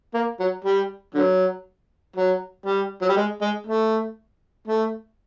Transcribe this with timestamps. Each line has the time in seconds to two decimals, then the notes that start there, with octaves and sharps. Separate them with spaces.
0.14 A#3
0.40 F#3
0.64 G3
1.14 D3 F#3
2.16 F#3
2.66 G3
3.02 F#3
3.09 G3
3.16 G#3
3.41 G#3
3.66 A3
4.68 A3